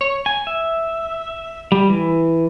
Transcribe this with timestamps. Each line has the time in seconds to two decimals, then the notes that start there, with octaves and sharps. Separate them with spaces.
0.01 C#5
0.26 G#5
0.47 E5
1.72 G3
1.90 E3